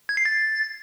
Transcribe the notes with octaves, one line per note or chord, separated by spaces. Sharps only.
G#6
C7
A6